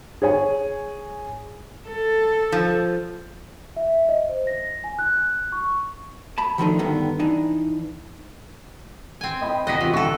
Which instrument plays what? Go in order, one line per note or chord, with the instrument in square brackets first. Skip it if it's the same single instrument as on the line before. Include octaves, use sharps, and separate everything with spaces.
[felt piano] G#4 C#5 G#5
[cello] A4
[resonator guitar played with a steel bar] F3
[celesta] E5
D#5
C5
A#6
G#5
F#6
C#6
[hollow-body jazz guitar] A5 B5
D#3 F3 A3 B3 D4 D#4
G2 D3 D#3 G3 B3
E3 D4 D#4
[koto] C4 G#5
[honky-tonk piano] D#5 G5 B5
[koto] C3 F#4 D#5 [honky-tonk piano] F#6 A#6 B6
[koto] E3 [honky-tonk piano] F4
[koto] D3 A4 [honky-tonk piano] G5 C#6 F#6